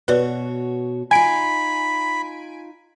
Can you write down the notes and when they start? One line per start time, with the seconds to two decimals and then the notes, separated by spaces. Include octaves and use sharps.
0.08 B2 F#4 B4 C#5 D5
1.11 D#4 F4 G#5 B5 D7